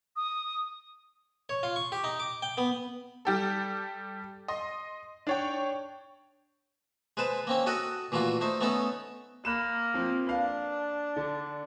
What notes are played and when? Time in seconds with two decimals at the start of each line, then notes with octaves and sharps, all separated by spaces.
0.16 D#6
1.49 C#5
1.63 F4
1.76 C#6
1.92 G4
2.04 D#4
2.20 D6
2.42 G5
2.58 B3
3.25 G3 G4 A4
4.48 D#5 C6
5.27 D4 C#5 G5
7.17 G#3 B4 C5 A5
7.47 A#3 C4 C#4
7.66 F#4 A4 D#5 F#5
8.12 A#2 E3 A3 F4 F#4
8.41 A3 D#4 C5
8.61 A3 B3 C#4 D#4 A4
9.45 A#3 B5 F#6 E7
9.94 F3 C4
10.27 D4 B4 F5
11.16 D3